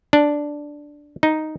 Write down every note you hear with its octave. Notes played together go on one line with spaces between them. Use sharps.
D4
D#4